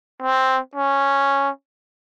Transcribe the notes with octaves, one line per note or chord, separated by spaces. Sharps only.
C4
C#4